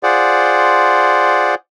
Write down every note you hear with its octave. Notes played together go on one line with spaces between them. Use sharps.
F4 G#4 C5 D5 F#5